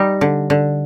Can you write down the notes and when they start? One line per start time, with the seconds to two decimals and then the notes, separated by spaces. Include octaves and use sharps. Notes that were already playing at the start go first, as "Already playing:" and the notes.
Already playing: G3 D#4
0.21 D3
0.50 D3